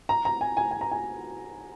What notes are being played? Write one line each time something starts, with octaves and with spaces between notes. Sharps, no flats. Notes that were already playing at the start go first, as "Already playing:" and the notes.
A#5
A#5
G#5
G#5
G#5
A#5
G#5